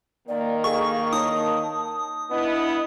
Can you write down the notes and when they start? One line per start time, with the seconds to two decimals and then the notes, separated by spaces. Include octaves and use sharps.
0.28 D#3 A#3 D5
0.64 G#4 A4 D#5 F5 C#6
1.13 D#4 C#5 A5 D#6
2.31 B3 D4 E4 D#5